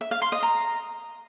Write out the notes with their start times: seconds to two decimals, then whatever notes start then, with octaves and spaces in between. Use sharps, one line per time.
0.01 E5
0.11 F5
0.22 C6
0.32 D#5
0.43 A#5